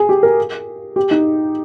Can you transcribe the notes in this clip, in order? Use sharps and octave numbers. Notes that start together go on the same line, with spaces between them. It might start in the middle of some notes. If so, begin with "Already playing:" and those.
Already playing: G#4
G4
A#4
G4
D#4